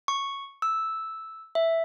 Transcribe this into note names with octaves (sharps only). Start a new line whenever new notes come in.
C#6
E6
E5